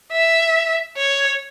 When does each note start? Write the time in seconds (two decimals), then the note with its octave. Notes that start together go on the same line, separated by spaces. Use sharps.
0.12 E5
0.97 C#5